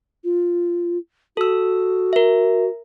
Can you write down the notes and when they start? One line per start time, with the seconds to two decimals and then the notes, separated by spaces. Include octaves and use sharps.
0.24 F4
1.37 F#4 A4 E6
2.13 A#4 E5